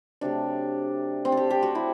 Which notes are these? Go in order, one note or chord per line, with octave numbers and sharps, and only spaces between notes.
C3 F#3 A3 D4
C4
A4
G4
G4
F#4
E4